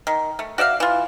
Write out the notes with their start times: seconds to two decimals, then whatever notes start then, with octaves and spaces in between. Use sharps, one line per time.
0.07 D#3
0.39 A3
0.58 F#4 D5 E5 F5
0.80 E3 F4